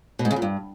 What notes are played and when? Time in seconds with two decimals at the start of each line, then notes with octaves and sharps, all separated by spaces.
0.19 B2
0.25 G#2
0.31 C#3
0.36 A#2
0.42 G2